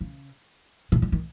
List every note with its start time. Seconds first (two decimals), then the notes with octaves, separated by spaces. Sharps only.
0.01 C#3
0.92 C3
1.02 D3
1.12 D#3